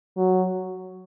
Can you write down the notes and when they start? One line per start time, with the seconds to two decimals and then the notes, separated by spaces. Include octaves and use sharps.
0.17 F#3